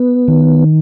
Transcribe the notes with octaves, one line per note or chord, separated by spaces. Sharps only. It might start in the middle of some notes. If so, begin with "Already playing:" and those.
Already playing: B3
D#3